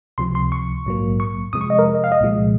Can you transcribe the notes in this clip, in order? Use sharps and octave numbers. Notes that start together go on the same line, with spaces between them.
C#2 C3 F3 C6
C6
C#6
A#1 G#2 F#3 A#3
C#6
F2 C3 F3 G#3 D#6
C#6
D#5
A#4
D#5
F5
D#5
C2 A#2 F3 G#3